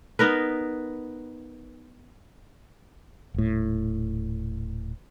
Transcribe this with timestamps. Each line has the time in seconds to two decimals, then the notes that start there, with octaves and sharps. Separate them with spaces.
0.19 B3 D#4 A#4 B4
3.34 D#1 A2